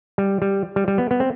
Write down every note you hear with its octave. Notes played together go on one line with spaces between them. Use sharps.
G3
G3
G3
G3
B3
B3
C4